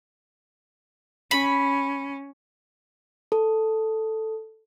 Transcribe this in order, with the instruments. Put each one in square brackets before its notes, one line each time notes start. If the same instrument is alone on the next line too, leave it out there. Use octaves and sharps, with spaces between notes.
[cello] C#4 [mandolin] B5
[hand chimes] A4